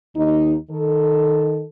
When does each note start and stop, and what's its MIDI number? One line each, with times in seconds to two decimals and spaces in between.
0.17 0.56 39
0.17 0.56 63
0.71 1.64 51
0.71 1.64 69